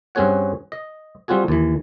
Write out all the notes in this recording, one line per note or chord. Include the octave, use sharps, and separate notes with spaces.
G2 C4 C#4 G#4 C#5 F#5
D#5
G3 C4 F4 F#4 G#4
D#2 E3